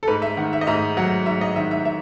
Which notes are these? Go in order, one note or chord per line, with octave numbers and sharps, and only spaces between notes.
A4
G#2 B4
E5
D#3 F#5
E5
D#5
G#2 E5
F#3 F#5
G#2 E5
D#5
D#3 E5
E5
E5